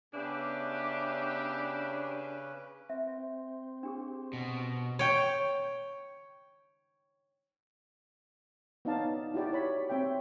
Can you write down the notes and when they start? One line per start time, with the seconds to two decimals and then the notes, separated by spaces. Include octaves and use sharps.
0.14 C#3 B3 C#4 D4 G4 B4 E5 D6
2.89 C4 E5
3.83 D4 G4 G#4
4.33 B2
4.99 C#5 G5
8.85 B3 C#4 D#4 D5 F5 A5
9.34 E4 F#4 G4 D5
9.53 C#5 B5
9.90 C4 C#5 E5 G5